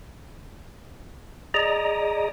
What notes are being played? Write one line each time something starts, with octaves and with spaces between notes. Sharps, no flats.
G#4 D5 D#5 A#5